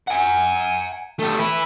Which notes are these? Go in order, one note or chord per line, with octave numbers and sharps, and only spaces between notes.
F#5 G#5
A3 G4
E4 B4